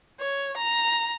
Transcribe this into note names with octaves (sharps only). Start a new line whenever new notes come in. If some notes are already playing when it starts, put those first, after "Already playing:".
C#5
A#5